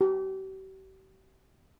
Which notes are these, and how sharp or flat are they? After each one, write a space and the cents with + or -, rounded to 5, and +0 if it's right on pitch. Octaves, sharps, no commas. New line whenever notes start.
G4 -45